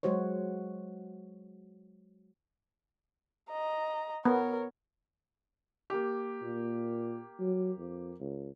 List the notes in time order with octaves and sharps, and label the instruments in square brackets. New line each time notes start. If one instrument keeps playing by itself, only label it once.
[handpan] F#3 G#3 F#4 C5 C#5
[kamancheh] D#5 A#5
[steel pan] B3 [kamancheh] A#4 C#5
[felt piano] A#3 G4
[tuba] A#2
F#3
F2
C#2